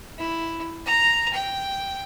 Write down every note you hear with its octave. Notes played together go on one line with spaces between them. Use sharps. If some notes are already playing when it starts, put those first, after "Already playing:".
E4
A#5
G5